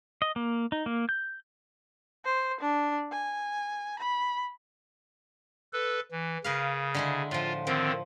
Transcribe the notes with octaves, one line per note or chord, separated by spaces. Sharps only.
D#5
A#3
D#4
A#3
G6
C5
D4
G#5
B5
A4 B4
E3
C#3 A#4 B4 F5
D3 G#3 E4
A2 F3 F4
D3 D#3 F3 C4